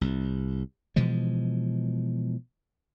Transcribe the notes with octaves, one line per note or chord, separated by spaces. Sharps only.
C2
B2 E3 F3 G#3